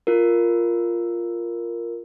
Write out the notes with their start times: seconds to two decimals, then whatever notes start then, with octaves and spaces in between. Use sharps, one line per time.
0.07 F4 A#4